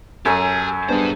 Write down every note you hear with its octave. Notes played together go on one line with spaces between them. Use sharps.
F#2 G4 A4 C#5 G#5 A#5
G3 B3 D4 G#4 C5